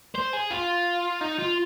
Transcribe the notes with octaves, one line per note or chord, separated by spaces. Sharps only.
C5
G#4
F4
D#4
F4